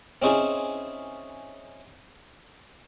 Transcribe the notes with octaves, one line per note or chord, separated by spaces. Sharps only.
C4 C#4 D#4 E4 G#4